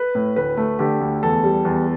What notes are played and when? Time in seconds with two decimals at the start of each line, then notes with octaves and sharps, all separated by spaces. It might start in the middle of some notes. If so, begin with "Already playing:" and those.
Already playing: B4
0.15 A2
0.36 D2 B4
0.57 A3
0.79 D3 G4
1.01 D2
1.23 E2 A4
1.44 G3
1.65 E2